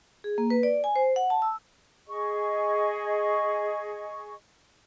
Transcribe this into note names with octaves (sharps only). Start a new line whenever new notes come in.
G#4
A#3
B4
D5
G#5
C5
F#5
A5
E6
G#4 D#5 C#6